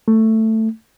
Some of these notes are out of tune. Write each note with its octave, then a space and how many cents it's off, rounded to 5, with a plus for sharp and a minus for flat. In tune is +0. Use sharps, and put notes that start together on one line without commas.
A3 +10